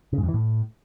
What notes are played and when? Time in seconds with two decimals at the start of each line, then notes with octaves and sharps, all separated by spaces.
0.13 C#3
0.18 G#2
0.23 F2
0.29 E3
0.34 A2